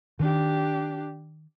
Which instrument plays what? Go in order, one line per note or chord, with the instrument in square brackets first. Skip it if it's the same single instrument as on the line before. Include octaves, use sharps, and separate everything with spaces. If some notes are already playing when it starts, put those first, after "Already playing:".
[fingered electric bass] D#3 [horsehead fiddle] D4 G4